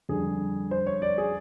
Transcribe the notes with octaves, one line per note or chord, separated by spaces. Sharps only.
F2 D3 G3 G#4
C5
C#5
D5
G#4